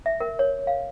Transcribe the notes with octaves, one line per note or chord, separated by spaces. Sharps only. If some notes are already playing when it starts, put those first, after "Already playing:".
E5
A#4
C#5
F5